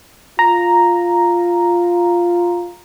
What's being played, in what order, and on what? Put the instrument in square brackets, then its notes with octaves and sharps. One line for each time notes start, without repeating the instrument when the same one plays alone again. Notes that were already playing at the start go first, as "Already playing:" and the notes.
[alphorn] F4 [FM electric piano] A#5